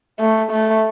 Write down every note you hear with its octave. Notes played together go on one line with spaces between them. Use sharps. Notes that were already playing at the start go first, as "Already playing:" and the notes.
A3
A3